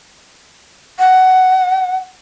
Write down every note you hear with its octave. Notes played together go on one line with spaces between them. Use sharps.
F#5